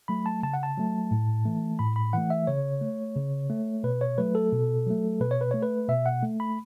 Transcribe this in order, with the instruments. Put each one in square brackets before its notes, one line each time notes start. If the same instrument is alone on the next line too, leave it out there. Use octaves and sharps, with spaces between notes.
[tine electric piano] F#3 A3 B5
A5
C#3 A5
F#5
A5
F#3 A3
A2
E3 A3
A2 B5
B5
E3 A3 F#5
E5
C#3 C#5
A3
C#3
A3
B2 B4
C#5
F#3 A3 B4
A4
B2
F#3 A3
B2 B4
C#5
B4
A3 C#5
B4
B2 E5
F#5
A3
B5